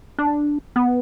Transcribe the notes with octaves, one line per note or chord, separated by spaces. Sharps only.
D4
B3